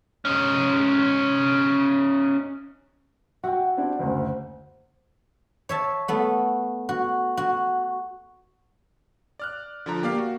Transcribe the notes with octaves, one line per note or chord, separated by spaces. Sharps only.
C#4 D#4
F#4 E5 F#5 G5
C4 D4 E4 D5
F#1 D2 C5
C#5 E5 A5
A3 B3
F#4
F#4
D5 F6 F#6
D3 F3 A#5
A#3 G4 D5 F5
F#4